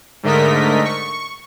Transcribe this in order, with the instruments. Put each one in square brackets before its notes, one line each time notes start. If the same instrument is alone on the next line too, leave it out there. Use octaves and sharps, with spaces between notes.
[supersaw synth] G#2 D3 A3 A#4 D#5 B6
C#6